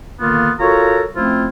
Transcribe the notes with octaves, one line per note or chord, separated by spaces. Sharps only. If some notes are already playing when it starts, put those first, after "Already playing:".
A#2 D3 D#3 A#3 B3 F4
F4 F#4 A4 A#4 C#5 A#5
F3 A3 C4 C#4 E4 F4